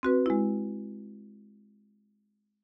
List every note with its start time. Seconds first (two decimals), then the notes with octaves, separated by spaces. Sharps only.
0.03 C4 F#4 B4
0.26 G#3 E4